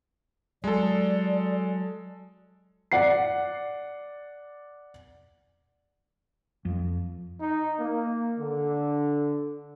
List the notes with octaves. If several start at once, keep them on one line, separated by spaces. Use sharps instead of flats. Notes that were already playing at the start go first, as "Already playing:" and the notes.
F#3 G#3 A4 D5
D5 F#5 C7
F2
D#4
A#3
D3